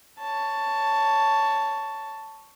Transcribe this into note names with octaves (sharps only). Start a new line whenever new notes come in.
C#5 A5